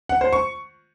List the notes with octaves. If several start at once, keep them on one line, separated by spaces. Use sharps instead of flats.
F#5
C5
C#6